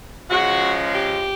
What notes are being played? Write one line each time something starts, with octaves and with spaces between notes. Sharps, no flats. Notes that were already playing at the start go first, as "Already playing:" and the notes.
C#3 F3 G#3 F#4
G4